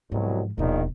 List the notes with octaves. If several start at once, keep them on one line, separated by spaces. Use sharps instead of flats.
C2 G#2 B2 F3 F#3
D#1 A#1 B2 D#3